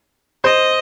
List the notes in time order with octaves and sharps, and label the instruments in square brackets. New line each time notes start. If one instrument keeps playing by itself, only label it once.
[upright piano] C5 [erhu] D#5